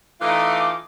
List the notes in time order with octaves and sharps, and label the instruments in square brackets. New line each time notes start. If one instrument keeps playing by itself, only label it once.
[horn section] E3 A3 D#4 [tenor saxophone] F4 [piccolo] D6